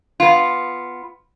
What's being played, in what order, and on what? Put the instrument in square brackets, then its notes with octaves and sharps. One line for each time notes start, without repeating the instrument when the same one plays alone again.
[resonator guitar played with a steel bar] B3 F4